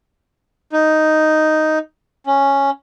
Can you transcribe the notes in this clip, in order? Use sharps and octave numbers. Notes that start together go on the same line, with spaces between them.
D#4
C#4